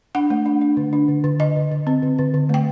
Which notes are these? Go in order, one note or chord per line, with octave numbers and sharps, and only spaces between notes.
D4 F#5
A3
D4
D4
D3
D4
D3
D3
D3 D#5
D3
D3
C4
D3
D3
D3
A3 G5